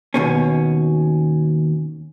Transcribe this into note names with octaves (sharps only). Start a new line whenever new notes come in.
D#2 B2 C#4